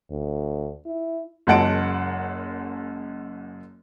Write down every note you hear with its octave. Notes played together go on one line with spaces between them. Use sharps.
D2
E4
F#1 F#2 G#3 F#5 A5 D7